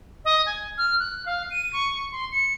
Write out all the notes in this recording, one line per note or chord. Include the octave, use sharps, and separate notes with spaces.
D#5
G#5
F6
F#6
F5
D#7
C#6
C6
C#7